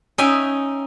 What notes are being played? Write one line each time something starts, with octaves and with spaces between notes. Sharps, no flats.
C#4 D#4 E5 G5 G#5